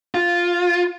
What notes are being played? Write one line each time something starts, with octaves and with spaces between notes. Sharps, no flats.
F4